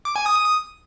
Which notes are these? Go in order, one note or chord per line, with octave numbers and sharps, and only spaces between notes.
D6
G#5
D#6